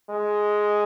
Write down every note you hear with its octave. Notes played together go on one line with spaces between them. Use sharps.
G#3